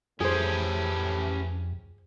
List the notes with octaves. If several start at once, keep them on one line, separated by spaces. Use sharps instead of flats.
F2 A2 E3 C#4 G4 G#4 C5